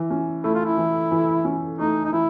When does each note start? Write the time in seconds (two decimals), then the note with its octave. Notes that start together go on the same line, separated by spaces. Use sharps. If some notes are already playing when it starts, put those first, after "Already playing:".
Already playing: E3
0.11 C#4
0.44 A3 E4
0.55 F4
0.65 E4
0.77 E3
1.11 E3
1.45 C#4
1.79 A3 D#4
2.05 D#4
2.12 E3 E4